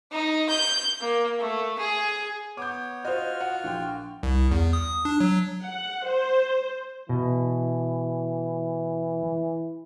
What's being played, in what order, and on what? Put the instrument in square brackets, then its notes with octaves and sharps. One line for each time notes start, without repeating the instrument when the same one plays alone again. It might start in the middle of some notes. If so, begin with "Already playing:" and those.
[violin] D#4
G6
A#3
A3
G#4
[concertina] B3 C#5 [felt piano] D6 G6
[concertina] F4 F#4 F6 [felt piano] C5 D#5
[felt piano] F#5
A#1 G5
[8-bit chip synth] C2
E2
D#6
D4
F#3
[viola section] F#5
C5
[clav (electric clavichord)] B2 [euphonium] E3